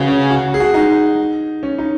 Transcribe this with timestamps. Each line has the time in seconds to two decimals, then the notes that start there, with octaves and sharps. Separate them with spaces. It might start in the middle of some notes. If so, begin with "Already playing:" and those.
Already playing: C#3 F#4 B4
0.08 C#4
0.30 F#4
0.54 G#4
0.60 F#4
0.74 D#4
1.63 C#4
1.78 D#4